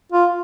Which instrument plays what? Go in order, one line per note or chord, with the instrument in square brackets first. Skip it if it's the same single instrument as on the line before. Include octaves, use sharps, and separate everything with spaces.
[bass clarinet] F4